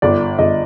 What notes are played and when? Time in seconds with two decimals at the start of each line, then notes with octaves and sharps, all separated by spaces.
0.02 G1 D5
0.39 G1 D#5